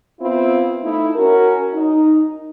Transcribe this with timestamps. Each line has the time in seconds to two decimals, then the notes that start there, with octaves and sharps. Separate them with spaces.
0.21 B3 C4 E4 F4
0.81 A3 D#4 E4
1.15 C#4 F#4 A#4
1.74 D#4